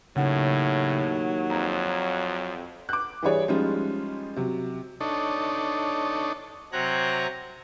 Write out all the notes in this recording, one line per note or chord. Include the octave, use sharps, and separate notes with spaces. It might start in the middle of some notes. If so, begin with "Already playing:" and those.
D#2 A2 C#3 F#3 F#5
F2 A#5
D6 F#6
E3 G3 G#4 C#5 D5
F3 G3 G#3 C#4 D#4 F4
C3 F#3
D4 D#4 A4 C#5
C3 F#3 C4 C#5 A#5 F#6